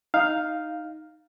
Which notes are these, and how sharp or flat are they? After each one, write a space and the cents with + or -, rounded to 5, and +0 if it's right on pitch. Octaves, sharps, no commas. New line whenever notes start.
D#4 +0 F5 +0